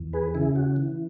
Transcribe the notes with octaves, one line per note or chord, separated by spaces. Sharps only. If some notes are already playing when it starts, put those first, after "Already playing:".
Already playing: E2
G#4 B4
C#3 E4 G#4
F#4
E3